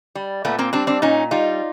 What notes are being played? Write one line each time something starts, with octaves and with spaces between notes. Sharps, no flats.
G3
A#2 A3 B3
A#3 C4
G3 C4 D4
C4 D4
A#2 C#4 D#4
G3 D#4 F4